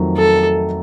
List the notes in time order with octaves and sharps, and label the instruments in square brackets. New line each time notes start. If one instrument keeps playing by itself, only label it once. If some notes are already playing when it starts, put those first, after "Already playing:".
Already playing: [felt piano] F2 D#3 F#3 A3 C4
[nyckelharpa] A4